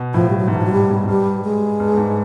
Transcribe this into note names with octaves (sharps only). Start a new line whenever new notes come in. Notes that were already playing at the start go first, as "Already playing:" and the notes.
Already playing: B2
A2 F3
G3
F#3
G#2
E3
G2 F3
F#3
G2 G3
G#2
G#2
G2 G3
G#3
G2
G2
G#2